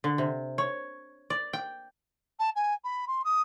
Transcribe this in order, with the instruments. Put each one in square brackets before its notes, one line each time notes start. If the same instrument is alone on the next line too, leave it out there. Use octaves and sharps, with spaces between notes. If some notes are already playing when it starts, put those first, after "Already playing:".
[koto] D3
C3
C#5
D5
G5
[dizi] A5
G#5
B5
C6
D#6